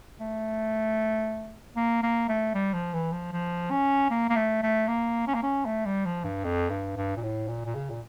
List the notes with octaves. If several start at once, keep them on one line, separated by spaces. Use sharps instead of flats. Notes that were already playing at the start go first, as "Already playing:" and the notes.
A3
A#3
A#3
A3
G3
F3
E3
F3
F3
C#4
A#3
A#3
A3
A3
A#3
C#4
A#3
C#4
A3
G3
F3
G2
F2
G2
G2
A#2
A2
A#2
A#2
C#3
A#2